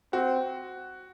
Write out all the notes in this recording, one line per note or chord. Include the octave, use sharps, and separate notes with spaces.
C4 F#4